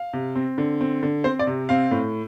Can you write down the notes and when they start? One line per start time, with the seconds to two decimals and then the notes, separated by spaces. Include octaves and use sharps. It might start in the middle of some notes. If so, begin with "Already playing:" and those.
Already playing: F5
0.13 C3
0.35 C4
0.58 D3
0.81 C4
1.03 D3
1.24 C4 C5
1.39 D5
1.47 C3
1.69 C4 F5
1.91 A2